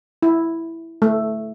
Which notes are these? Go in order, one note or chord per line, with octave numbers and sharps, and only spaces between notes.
E4
A3